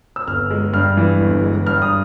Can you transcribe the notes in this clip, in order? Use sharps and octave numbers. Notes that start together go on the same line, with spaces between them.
E6
G1 F6
G#3
G2 F6
E3
G1
G#3
G2 F6
D#6